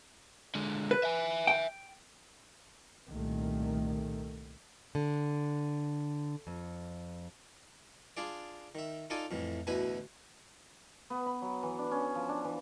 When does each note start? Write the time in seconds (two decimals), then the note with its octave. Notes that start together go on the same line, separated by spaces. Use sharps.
0.55 D3 G#3
0.91 B4
1.03 E5 G#5
1.47 G5
3.10 C2 A#2 D#3 A3
4.95 D3
6.47 F2
8.17 D4 F4 G#4 D5
8.75 D#3 E5
9.10 D#4 F4 A4 D5 G#5
9.31 F2 A2 E3
9.67 A1 D2 B2 E4 B4 G#5
11.10 B3
11.26 B5
11.42 F#3
11.63 E3
11.79 D4
11.91 C#4
12.15 F3
12.29 D4
12.44 E3